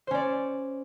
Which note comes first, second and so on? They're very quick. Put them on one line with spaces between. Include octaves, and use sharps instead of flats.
C5 C#4 D5